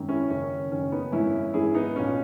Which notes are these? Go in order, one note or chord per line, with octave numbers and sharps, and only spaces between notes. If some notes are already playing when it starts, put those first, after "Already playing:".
Already playing: G#1 F#2 D#3
C#4 E4
F#1 F#2 D#3 C#4
F#1 F#2 D#3 C#4
B3 D#4
G#1 F#2 E3 C#4 E4
G#1 F#2 E3 E4 G#4
B3 D#4
B1 A#2 C#4